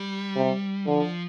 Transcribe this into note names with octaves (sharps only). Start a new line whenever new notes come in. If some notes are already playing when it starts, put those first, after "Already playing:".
Already playing: G3
C3
D3 F3